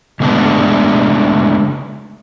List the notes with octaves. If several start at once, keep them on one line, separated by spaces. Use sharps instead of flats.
C#3 G#3 A3 B3 D4